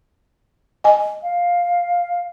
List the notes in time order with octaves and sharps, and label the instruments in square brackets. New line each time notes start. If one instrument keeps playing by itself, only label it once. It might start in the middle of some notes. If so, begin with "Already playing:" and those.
[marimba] D#5 G#5
[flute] F5